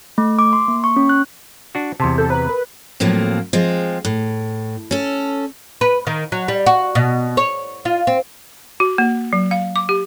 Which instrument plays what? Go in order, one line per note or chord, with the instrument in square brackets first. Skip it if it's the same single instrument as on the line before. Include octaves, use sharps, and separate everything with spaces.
[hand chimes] A3
D6
C6
A#3
C#6
C#4
F#6
[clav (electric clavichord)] D4 F#4
[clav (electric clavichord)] E2 C3 [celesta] A5 C6
[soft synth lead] A4 [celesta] G6
[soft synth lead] B4 [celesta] C5 A#5
[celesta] A#4
[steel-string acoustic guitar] F2 A2 F3 F#3 A#3
F3 G#3 C4
A2
C#4 A4
[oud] B4
D#3
F#3
G3
F#4
B2
C#5
F4
C4
[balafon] F#4
A#3
F#3
F5
D6
G4